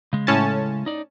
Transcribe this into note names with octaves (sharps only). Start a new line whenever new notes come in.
C#3 G#3
A2 C#4 A5
D#4 D5